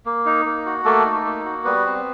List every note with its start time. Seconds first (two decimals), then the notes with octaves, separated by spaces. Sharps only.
0.06 A#3
0.26 D#4
0.45 A#3
0.66 F#4
0.85 A3 A#3 A4
1.05 D#4
1.25 A#3
1.45 F#4
1.65 G3 B3 B4
1.86 C4